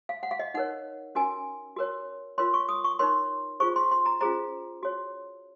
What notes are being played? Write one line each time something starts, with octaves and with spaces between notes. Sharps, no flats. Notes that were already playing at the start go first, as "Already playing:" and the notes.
F5
F#5
F5
D#5
D#4 A#4 C#5 F#5
C#4 F#4 A#4 G#5
F#4 A#4 C#5
F4 A#4 C#5 C6
C#6
D#6
C#6
D#4 A#4 C#5 C6
F4 G#4 C5 C#6
C6
C6
A#5
C#4 F4 G#4 C5 A#5
F#4 C#5